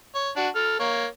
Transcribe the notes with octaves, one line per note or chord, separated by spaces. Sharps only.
C#5
D4 F#4
A4 F6
A#3 C#5